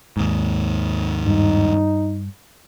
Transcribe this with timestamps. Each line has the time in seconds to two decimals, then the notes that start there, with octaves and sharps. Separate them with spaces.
0.17 D#2 G#2
1.27 G2 D#4